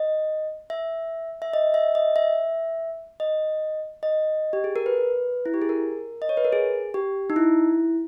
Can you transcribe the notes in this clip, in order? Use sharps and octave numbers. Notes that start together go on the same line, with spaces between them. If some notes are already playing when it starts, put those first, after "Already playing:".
Already playing: D#5
E5
E5
D#5
E5
D#5
E5
D#5
D#5
G4
G#4
A#4
B4
E4
G4
G#4
A#4
D#5
C#5
B4
A#4
G#4
G4
D#4
E4